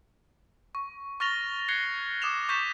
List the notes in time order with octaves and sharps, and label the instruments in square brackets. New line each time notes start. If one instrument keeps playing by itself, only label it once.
[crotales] C#6
C#6 F6 A6 A#6 F7 G7
F#6 G#6 A#6 C7 C#7 G7
D6 D#6 A#6 E7 F7
C#6 G6 A6 B6 E7